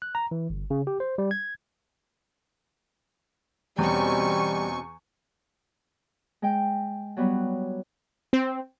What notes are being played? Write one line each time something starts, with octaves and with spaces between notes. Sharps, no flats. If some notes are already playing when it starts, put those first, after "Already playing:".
F#6
A#5
E3
G1
C#3
G4
C5
G3
G#6
E2 B2 G3 C4 C#4 G#5 C#6
G#3 G5
F#3 G3 B3
C4